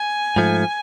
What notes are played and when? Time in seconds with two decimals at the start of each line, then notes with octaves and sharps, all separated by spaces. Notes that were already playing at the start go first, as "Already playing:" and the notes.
Already playing: G#5
0.36 G#2 F3 A3